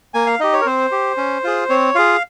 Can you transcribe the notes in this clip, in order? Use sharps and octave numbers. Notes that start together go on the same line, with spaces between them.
A#3 G#5
F5
D#4 G4 D#5
C#5
A#4
C4 C5
G4
C#4
F4 G#4
C4 C#5
F4 G#4 F5